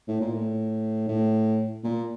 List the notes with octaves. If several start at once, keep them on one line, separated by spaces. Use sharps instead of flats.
A2
A#2
A2
A2
A#2